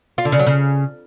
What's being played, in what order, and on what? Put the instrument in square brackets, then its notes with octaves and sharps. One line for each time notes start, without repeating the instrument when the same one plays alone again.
[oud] F4
D3
C#3
F#3
C#3